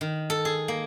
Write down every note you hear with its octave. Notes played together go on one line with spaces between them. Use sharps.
D#3
A4
G#4
A#3